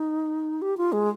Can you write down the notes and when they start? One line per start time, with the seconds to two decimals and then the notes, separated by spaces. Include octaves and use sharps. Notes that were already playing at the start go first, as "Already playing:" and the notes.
Already playing: D#4
0.62 G4
0.77 F4
0.92 G#3